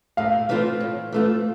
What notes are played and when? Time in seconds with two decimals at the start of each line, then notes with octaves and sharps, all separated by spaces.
0.17 A2 F5
0.49 E3 A3 C4 F4
0.80 A2
1.12 E3 A3 C4 F4